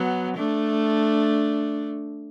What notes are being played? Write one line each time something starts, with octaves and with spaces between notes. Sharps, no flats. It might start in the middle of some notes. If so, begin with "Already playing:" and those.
Already playing: F#3 B3
A3 D4